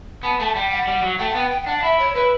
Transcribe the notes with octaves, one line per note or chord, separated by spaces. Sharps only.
B3 A5
A3 A5
G3 G5
F#5
G3
F#3
A3 G5
F#5
B3 G5
G5
G5
D4 F#5
F#5
E4 E5
C#5
E4 B4